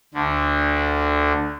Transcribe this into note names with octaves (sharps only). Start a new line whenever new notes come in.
D2 D3